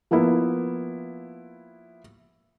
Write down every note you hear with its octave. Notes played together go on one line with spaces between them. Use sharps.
F3 A#3 B3 E4